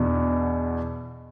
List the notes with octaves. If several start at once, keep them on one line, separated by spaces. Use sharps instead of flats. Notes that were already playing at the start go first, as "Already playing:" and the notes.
Already playing: E2 B2 D4